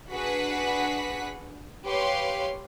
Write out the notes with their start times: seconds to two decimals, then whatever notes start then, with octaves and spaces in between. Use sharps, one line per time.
0.12 D4 F#4 G#4 B4 F#5 B6
1.86 G4 B4 C#5 F5 C6